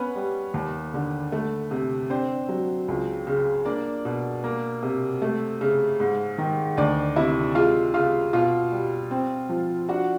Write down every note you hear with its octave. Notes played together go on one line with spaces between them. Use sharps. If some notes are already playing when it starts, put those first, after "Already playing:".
Already playing: B3 C#4 B4
G3
D#2
D3
A3
C3
C4 D4 C5
F#3
C#2
C#3
A#3 D4 D5
B2
A#3
C3
A3
C#3
G#2
D#3
D2 D4 D5
C3 E4 E5
G#3 F4 F5
C#3 F4 F5
B2 F4 F5
G3
C4
F3
D4 F#4 F#5